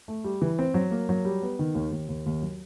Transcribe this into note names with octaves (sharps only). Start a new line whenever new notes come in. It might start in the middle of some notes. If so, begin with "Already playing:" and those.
A3
G3
E3
C4
F#3
A#3
F#3
G3
B3
D#3
D#2
D#2
D#2
D#2
F#3